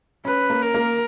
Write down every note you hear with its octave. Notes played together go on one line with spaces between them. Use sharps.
C#4 B4
A#3
A#4
A#3